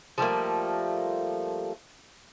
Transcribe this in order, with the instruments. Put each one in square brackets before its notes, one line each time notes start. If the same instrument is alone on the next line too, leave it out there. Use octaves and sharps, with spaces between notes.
[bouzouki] F3 G3 A3 A#3